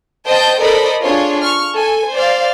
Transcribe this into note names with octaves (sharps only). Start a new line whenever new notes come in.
C5 D#5 G5 A5 G6
A4 A#4 C5 D5 D#5 B5
D4 F4 G#4 C#5
C#6 F6
A4 G#5
C5 D5 F5